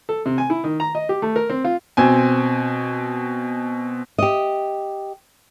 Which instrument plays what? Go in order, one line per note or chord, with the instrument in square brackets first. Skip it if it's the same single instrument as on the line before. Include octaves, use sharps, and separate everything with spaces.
[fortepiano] A4
C3
G#5
E4
D#3
A#5
D#5
G4
A3
A#4
C4
F4
[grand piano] B2 C4 G#5
[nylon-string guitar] G4 D#5